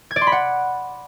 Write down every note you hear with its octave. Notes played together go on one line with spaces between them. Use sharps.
G#6
D5
C6
B5
F#5